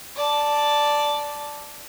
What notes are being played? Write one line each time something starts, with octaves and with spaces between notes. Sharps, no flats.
D5 A5